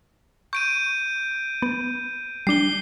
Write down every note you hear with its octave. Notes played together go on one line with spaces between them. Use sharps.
C#6 G6 D7 D#7
B3
G3 D4 C7 G7